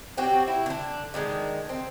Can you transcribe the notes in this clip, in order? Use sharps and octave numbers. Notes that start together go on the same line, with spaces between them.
C4 C#4 F#4 G4
E4
D3 D4
D3 D#3 G#3
C4